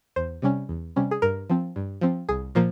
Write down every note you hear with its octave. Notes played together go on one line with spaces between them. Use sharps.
E2 C5
C3 G3 C#4
E2
C3 G3 C#4
G#4
G2 A#4
F3 C4
G2
F3 C4
C2 G#4
A#2 F3 A#3